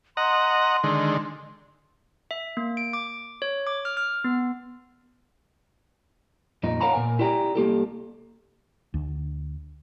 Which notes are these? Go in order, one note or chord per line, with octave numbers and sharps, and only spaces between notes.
D#5 F#5 A#5 C6
D3 D#3 G#3
E5
A#3
D7
D6
C#5
D6
F6
F6
B3
F2 A#2 D#4
A#4 C#5 F5 F#5 A#5 B5
A#2 A#4 G#5
E4 G4 D5 G5 A#5
C2 A#3 G4 A4
D2